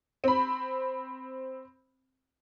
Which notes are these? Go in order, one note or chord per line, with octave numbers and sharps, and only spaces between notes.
C4 B5